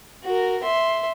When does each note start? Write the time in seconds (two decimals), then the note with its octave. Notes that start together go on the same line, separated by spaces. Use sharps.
0.24 F#4 A#4
0.63 E5 C6